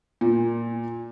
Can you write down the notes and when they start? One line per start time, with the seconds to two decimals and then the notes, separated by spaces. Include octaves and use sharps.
0.21 A#2